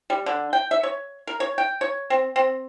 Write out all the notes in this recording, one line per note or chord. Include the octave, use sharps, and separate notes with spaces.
G3
D3
G5
E5
C#5
A#4
C#5
G5
C#5
C4
C4